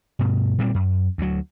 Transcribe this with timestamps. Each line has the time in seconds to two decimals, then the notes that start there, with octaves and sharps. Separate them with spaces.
0.19 G2 B2
0.58 A#2 G3 A#3 C4
0.74 F#2
1.18 D2 F#3